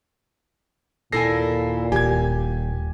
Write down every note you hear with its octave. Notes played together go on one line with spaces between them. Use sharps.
D#2 A#2 E4 A4 G#5 A#6 C7
D#1 G4 G#5 G#6